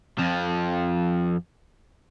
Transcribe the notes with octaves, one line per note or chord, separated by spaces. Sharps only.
F2 F3